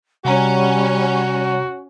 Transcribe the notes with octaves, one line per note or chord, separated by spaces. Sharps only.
C3 G3 C#4 F#4 C#5 F#5 A#5